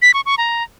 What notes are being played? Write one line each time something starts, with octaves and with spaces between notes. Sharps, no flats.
B6
C#6
C#6
A#5